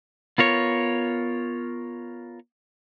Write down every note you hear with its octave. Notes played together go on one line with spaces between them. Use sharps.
B3 F4 A#4 C#5